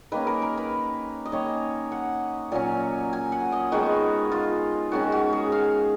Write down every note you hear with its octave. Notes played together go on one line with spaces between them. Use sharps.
D#3 A#3 C#4 B4
A#4
A#4
B4
D#5
D#3 A#3 C#4 C#5
F#5
A#2 F#3 C#4 G#5
G#5
F#5
D#5
D#3 G#3 B3 D#4 F#4
F4
D#3 G#3 C#4 F#4
F#4
G#4
F5